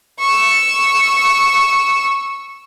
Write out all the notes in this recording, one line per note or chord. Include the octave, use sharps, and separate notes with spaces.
C#6 E6